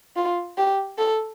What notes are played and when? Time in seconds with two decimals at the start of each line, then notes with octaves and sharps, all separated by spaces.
0.16 F4
0.58 G4
0.98 A4